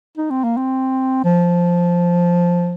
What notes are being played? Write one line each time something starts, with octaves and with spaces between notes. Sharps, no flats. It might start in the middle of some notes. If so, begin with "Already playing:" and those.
D#4
C4
A#3
C4
F3